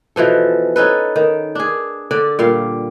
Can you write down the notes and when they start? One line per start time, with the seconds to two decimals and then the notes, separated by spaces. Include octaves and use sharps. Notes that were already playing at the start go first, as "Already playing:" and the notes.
0.16 B2 E3 F3 A4
0.76 C#4 D#4 A4 B4
1.16 D#3
1.55 D4 G#4
2.11 D3 D5
2.39 A#2 G3 F5